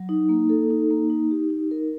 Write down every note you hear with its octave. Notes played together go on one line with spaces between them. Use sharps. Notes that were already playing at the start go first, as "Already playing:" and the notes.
Already playing: F#3
D#4
A#3
A4
D#4
A#3
D#4
G4
D#4
A#4